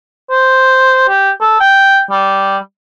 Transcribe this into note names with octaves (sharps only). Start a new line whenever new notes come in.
C5
G4
A4
G5
G3